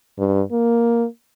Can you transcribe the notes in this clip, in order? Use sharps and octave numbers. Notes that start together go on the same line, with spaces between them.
G2
A#3